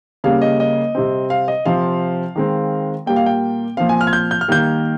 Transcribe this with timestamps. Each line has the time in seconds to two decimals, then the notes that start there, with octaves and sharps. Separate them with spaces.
0.24 C#3 G3 A#3 F5
0.42 D#5
0.60 D#5
0.95 C3 G3 C4
1.30 F5
1.48 D#5
1.66 C3 F3 C4 F5
2.36 D#3 G#3 C4
3.06 A#2 G3 A#3 G5
3.16 F5
3.26 G5
3.77 A#2 F3 C4 F5
3.89 G#5
4.01 F6
4.07 G#6
4.13 G6
4.31 G6
4.41 F6
4.48 D#3 G3 A#3 G6